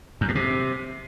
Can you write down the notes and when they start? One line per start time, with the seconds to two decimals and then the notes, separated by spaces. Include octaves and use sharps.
0.21 F#2
0.28 A2
0.35 C3